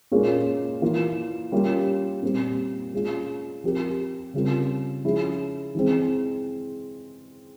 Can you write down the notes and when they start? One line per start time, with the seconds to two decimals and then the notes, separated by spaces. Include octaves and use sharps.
0.12 A#2 G#3 C#4 F4 A#4
0.82 E3 A#3 F4
1.52 G3 A#3 C#4 F4
2.23 A#2 G3 C4
2.94 G#3 C#4 F4
3.64 F3 C4 G4 A#4
4.34 C#3 G3 C4 F4 A#4
5.04 F3 G#3 C#4 E4 G#4
5.75 E3 G#3 C4